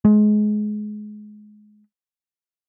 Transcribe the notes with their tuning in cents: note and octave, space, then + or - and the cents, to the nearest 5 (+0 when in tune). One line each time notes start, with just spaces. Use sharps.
G#3 +25